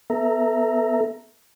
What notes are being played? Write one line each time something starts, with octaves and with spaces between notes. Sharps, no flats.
B3 A4 E5 A#5